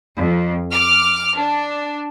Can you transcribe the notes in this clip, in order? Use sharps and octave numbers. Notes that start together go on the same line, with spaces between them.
F2
D6 F6
D4